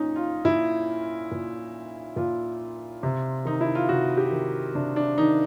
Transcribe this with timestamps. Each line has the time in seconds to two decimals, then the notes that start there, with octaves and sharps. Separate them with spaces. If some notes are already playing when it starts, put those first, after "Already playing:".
Already playing: A#2 C#4 D#4
0.16 F4
0.45 A#2 E4
1.31 A#2
2.16 A#2 F4
3.03 C3
3.45 D#3 D#4
3.61 E4
3.75 F4
3.89 C3 F#4
4.17 G4
4.31 D#3
4.75 C3 D4
4.96 D4
5.18 D#3 D#4